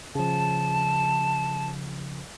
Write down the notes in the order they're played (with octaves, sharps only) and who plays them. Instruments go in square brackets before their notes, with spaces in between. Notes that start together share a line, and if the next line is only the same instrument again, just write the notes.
[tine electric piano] C#3 F3 [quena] A5